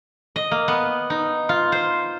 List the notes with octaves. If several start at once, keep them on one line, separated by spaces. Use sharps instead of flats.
D#5
A#3
B3
D#4
F4
C5